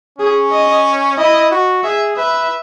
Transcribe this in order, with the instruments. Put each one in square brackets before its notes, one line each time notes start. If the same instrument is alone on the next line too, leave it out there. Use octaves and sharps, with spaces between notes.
[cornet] C#4 [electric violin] G#4
[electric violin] D#5
[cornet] E4 [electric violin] D#5
[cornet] F#4
[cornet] G#4 [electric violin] E5
[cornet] B4 [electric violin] E5